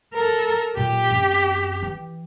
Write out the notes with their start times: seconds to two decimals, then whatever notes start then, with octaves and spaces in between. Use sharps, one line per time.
0.14 A4 A#4
0.77 A#2 F#3 G4
1.10 F#2 C4
1.83 E3